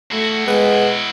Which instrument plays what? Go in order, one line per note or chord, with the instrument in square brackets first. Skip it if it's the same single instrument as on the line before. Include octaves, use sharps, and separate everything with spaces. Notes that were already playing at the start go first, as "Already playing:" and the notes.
[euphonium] A3 [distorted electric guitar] E4 F#4
[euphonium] G#3 [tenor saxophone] B3